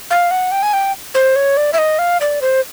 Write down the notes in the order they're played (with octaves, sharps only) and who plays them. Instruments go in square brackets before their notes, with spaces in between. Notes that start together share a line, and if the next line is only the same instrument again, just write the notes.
[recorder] F5
F#5
G5
G#5
G5
C5
C#5
D5
E5
D#5
F5
D5
C5